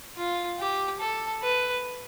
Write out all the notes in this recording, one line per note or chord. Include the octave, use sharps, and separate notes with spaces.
F4
G4
A4
B4